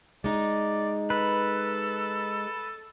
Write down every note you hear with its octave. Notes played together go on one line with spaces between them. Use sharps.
G#3 D#4 D5
A4 B4